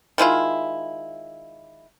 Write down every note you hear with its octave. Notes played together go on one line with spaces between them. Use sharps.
D#3 G#3 E4 F4